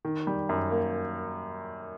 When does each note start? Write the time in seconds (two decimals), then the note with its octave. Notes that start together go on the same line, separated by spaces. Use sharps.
0.05 D#3
0.27 G3
0.49 F#2
0.71 A#3